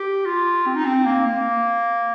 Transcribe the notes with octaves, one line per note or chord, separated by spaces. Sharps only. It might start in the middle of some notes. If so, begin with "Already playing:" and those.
Already playing: G4
F4
C4
D#4
C4
A#3
A#3